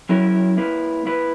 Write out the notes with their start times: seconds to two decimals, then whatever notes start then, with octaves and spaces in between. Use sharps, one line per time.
0.09 F#3 C#4 E4 A#4
0.57 A#3 E4 B4
1.05 A#3 E4 B4